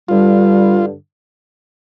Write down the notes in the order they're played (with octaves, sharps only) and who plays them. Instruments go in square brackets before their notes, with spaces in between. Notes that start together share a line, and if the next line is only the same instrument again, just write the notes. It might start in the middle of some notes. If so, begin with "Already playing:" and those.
[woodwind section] G2 D3 G3 [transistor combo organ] F4